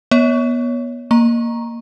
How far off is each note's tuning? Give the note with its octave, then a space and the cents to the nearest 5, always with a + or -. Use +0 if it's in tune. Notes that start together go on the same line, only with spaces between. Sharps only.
B3 -25 C#5 +15
A#3 +0 A#5 +10 C#6 -15